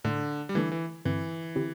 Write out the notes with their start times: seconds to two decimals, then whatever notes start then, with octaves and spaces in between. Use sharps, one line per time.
0.04 A2 D3 A3 D4
0.49 G3
0.55 D3 E3 A3 D4 A4
0.72 E3
1.05 G2 D3 E3 C4
1.56 D3 C4 E4 G4